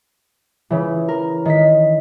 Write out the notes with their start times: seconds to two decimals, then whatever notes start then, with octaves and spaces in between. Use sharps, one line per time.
0.70 C#3 E3
1.08 A#4
1.45 D#3 D#5 B6